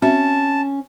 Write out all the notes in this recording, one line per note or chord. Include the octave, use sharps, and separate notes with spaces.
C4 C#4 F#4 E5 A5